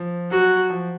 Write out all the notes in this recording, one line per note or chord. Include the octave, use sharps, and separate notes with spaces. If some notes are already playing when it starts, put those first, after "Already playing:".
Already playing: F3
F#3 F#4
F3